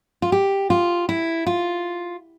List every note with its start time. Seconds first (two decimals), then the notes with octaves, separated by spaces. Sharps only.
0.22 F4
0.32 G4
0.70 F4
1.09 E4
1.47 F4